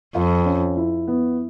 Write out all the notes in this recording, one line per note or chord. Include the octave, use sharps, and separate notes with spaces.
F2 F4
C#4
E4
B3